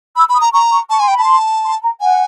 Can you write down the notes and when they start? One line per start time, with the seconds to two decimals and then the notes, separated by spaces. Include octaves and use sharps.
0.16 B5 E6
0.29 B5
0.35 D#6
0.41 A#5
0.53 A#5 C#6
0.72 C#6
0.90 A5 C#6
1.00 G#5 C6
1.08 G5
1.12 B5
1.18 A5
1.23 C6
1.64 C6
1.82 A#5
2.01 F#5 G#5